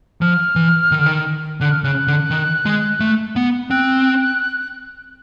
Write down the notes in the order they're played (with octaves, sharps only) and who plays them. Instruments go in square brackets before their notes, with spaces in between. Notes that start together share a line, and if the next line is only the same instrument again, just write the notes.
[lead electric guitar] F3 [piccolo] F6
[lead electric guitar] E3
D#3
D3
D#3
[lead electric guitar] D3 [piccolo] F#6
[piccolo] F6
[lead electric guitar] C#3 [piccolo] F#6
[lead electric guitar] D3
D#3
G#3
A3
B3
[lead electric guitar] C4 [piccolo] F#6